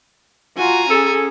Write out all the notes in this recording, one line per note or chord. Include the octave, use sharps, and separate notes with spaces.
F4 F#4 G#5 A#5
C#4 G#4 A4